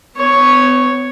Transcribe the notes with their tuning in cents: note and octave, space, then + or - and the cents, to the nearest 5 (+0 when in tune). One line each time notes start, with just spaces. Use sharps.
B3 +40 C#5 +0